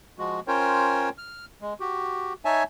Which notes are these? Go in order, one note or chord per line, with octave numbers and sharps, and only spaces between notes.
F3 G#3 F#4
C#4 F4 A#4 C5 C#5 G5
F6
G#3
F#4 G4
D#4 C#5 E5 G#5 A5